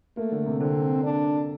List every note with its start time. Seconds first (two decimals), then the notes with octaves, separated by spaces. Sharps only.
0.17 A3 A#3
0.32 D3
0.46 C3
0.60 D3 C4
1.04 D4